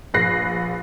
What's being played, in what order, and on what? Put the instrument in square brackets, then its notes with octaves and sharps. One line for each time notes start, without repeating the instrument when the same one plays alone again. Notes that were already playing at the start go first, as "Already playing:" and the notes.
[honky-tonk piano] A#1 B4 F#6 A#6 C7